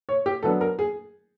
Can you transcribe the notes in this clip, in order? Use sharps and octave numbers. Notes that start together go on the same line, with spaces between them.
C#5
G4
F#3 B3 D4 A4
A#4
G#4